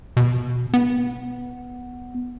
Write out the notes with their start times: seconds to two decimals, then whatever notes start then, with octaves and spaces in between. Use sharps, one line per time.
0.17 B2
0.74 B3